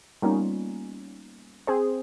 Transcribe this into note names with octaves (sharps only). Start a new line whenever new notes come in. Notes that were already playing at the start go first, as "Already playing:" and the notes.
G3 A#3 B3 C#4 D#4 F4
C4 G#4 C5